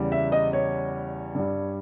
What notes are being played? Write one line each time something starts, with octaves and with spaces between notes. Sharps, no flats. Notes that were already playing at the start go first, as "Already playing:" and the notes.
Already playing: E2 C#3 G3
E5
D#5
C#5
G2 G3